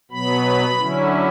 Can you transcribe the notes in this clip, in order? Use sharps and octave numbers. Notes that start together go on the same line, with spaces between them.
B2 F#3 B3 B5
D3 F#3 C#4 E4